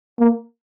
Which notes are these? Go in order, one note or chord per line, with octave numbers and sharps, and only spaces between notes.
A#3